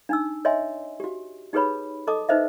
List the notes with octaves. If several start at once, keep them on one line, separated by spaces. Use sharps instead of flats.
D4 D#4 E6
C#5 D#5 E5 G#5 C6
F#4 G4
D#4 G4 G#4 B4 C#5 B5
A4 D#5 A5 D6 D#6
D#4 B4 C5 D#5 E5